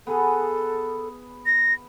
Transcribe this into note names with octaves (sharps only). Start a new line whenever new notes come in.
B3 G#4 A4 B4
A#6